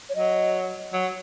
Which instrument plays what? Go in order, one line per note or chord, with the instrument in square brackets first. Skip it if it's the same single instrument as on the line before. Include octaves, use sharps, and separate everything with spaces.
[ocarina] C#5
[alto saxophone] F#3 [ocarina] D#5
[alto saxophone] F#3